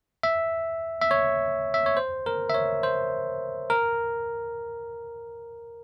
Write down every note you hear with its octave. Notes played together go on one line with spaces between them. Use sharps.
E5
E5
C#5
E5
C#5
C5
A#4
E5
C#5
C5
A#4